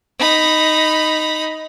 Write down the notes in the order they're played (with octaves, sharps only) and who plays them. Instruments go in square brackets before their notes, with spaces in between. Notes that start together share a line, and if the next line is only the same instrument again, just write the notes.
[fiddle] D#4 B5